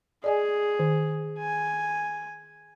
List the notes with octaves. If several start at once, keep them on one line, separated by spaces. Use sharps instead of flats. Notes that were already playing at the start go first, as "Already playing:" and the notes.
G#4 D5 D#5 G#5
D#3
G#5